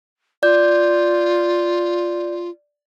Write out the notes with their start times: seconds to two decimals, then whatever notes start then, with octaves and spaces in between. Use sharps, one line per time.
0.43 F4 D5 G6